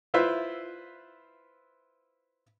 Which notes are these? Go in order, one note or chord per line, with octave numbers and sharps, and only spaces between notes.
E4 F4 B4 C5 E5